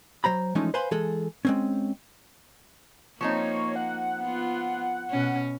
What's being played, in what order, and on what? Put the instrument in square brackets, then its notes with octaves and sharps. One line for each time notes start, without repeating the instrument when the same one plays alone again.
[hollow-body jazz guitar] F#3 C5 A#5 B5
E3 F3 G#3 A3 C#4 D#4
B4 C5 F5 G#5 B5 C6
E3 G#3 G#4 A4
G#3 C4 C#4
[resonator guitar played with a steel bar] F3 C4 D#4 [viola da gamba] A#3 [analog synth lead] C#5
[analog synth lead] F#5
[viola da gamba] B3 F4
B2 C#4